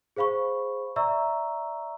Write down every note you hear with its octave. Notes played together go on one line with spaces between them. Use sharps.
G#4 C5 F5 B5 C#6
D5 E5 A#5 C#6 E6